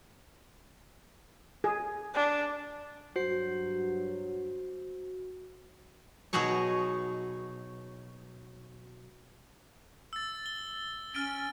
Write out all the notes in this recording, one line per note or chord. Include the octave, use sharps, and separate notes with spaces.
G#4
D4
G2 F#3 F#4 C5 C7
B2 F#3 D#4 F#4 G#4 C#5
E6 A6
G7
C#4 F6 A6 D7